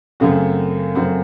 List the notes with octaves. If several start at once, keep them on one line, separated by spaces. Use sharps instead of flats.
F#2 C#3 A3 C4 F#4
F#2 C#3 A3 C4 F#4